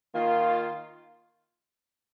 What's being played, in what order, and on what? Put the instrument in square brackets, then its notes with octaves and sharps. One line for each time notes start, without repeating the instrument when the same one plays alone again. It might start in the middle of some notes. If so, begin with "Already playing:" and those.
[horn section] D#3 A#3 F4